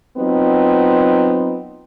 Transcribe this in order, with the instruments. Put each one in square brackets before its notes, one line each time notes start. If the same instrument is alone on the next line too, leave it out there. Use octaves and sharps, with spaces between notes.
[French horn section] F#3 B3 C4 D#4 F4